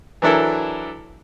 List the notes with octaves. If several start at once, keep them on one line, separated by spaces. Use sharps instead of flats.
E3 F#3 D4 E4 A4 A#4